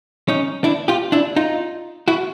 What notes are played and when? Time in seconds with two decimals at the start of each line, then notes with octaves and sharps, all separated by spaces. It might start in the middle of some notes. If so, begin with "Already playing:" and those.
0.28 C#4 D#4
0.64 D4 E4
0.88 F4 G4
1.12 D4 E4
1.36 D#4 F4
2.08 E4 F#4